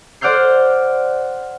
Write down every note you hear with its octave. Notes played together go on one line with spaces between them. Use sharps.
C5 D5 F#5 F6 G6 C7